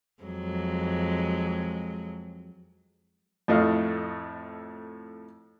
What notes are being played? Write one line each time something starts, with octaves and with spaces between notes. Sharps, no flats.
F2 F#3 G#3
F2 A2 A3 D#5 F5